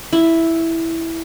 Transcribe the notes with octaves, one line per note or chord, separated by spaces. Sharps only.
E4